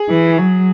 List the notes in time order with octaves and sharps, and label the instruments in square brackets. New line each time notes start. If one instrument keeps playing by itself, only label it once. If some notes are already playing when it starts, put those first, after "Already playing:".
Already playing: [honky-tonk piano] G#4
[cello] E3
F#3